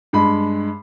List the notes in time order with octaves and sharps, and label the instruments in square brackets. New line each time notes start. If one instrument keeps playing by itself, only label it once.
[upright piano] G2 G#3 B5